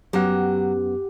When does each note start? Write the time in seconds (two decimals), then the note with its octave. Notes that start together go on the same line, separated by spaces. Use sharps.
0.13 F#2 F#3 B3 G4 F#5